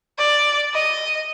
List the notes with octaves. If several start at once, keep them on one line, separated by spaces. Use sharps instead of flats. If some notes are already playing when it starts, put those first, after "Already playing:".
D5
D#5